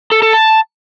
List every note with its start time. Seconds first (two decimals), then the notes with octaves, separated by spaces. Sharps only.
0.12 A4
0.22 A4
0.33 A5